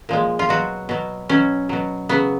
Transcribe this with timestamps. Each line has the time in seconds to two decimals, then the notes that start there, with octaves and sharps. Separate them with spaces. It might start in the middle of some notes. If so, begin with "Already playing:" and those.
0.09 A#2 F3 G#3
0.39 F4
0.49 B2 F#3 F#4
0.89 B2 F#3
1.29 B2 F#3 C#4
1.69 B2 F#3
2.09 C#3 F#3 B3